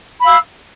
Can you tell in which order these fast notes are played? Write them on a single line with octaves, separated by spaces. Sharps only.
B5 F5 E6